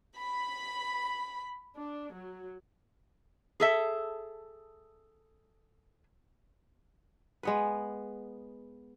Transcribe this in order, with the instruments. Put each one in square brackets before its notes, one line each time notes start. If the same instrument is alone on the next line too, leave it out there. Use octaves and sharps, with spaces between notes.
[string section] B5
D4
F#3
[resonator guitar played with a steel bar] G#4 A4 E5
[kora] G#3 B3 B4